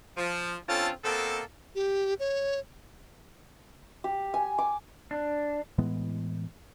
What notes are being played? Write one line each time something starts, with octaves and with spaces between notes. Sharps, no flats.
F3
D3 C4 C#4 F4 A4 A5
B2 A#3 C4 A4
G4
C#5
G4
G#5
D6
D4
A2 E3 G#3 B3